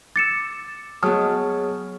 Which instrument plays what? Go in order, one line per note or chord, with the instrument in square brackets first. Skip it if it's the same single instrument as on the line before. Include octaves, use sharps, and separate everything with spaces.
[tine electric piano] D6 E6 [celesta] A6 C#7 E7
[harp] F#3 B3 [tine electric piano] G#4 C#5 A5 [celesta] D#6 F6